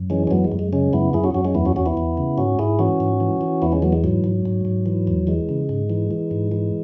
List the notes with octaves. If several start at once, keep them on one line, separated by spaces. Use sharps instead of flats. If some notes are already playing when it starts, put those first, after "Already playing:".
Already playing: F#2
E3 G#3 C#4
C#4
F#2 F#3 B3
G#3
F#2
G#3
C#3 G#3 C#4
F#2 B3 E4
F#2 E4 G#4
C#4 F#4
F#2 C#4 F#4
G#3 C#4
E2 B3 E4
C#4 F#4
E2 C#4 F#4
B3 E4
E2
C#3
G#2 C#4 F#4
G#2 E4 G#4
E3 C#4 F#4
G#2
E3
E3
E2 B3 E4
G#3 C#4
E3 F#3 B3
G#3
G#2 F#3
G#2
G#2
G#2
E3
E2
E3 G#3
C#3
G#2
E3
E3
G#2
E3